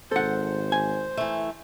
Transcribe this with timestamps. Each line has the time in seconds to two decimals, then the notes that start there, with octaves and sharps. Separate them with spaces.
0.12 G#1 A4 C5 F#5
0.72 G#5
1.17 E3 A3